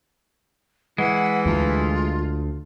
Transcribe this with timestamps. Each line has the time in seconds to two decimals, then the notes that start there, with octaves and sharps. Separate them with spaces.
0.98 E3 G#3 F#5
1.46 D2 F4